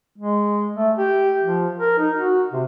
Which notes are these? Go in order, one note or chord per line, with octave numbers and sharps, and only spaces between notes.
G#3
A3
G4
F3
A#4
D#4
F#4
C3